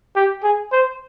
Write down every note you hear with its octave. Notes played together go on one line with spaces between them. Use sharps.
G4
G#4
C5